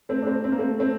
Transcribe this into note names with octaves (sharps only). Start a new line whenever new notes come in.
A3 C4
D4
A3 C4
C4
A#3
A3 C4
A3 C4